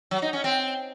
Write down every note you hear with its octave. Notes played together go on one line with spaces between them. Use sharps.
F#3
D#4
C#4
C4